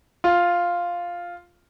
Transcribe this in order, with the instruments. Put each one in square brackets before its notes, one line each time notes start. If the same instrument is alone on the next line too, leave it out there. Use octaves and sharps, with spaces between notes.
[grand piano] F4